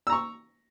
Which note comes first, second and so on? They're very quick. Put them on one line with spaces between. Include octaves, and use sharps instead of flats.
E6 A#5 C#6